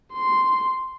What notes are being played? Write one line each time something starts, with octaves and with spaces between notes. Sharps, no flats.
C6